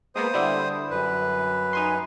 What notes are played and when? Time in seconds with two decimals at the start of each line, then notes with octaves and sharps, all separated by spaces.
0.16 G#3 A#3 B3 C5 D#6
0.34 D3 G3 E4
0.91 F#2 B4
1.73 D#4 G#5 C6